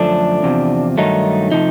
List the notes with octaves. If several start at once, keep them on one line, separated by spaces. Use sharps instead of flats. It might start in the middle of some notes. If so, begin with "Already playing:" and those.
Already playing: F#2 D3 F3 A3 D4
E2 C3 F3
G2 D#3 F#3 A3 D#4
C3 F3 A3 D#4